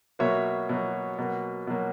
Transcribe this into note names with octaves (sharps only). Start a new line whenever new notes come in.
B2 F#3 A#3 C#5 E5
B2 F#3 A#3
B2 F#3 A#3
B2 F#3 A#3